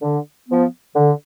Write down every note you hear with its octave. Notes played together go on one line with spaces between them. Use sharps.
D3
F3 B3
D3